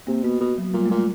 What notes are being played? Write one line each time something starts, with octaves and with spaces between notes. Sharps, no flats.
C3 A#3
B2 B3
B2
F#3
A#2 G3
A3
A#2 G#3